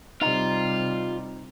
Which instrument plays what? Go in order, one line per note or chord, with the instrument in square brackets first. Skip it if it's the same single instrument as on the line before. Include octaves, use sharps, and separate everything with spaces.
[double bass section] C3 G3 [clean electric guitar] D#4 [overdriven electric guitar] F4